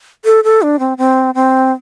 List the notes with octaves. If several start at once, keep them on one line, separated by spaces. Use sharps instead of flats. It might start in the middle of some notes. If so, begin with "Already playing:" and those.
A4
A4
D4
C4
C4
C4